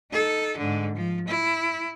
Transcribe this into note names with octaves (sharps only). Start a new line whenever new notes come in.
D#4 A4
G#2 D3
F3
E4